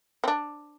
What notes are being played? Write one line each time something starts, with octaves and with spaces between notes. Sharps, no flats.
C4
D4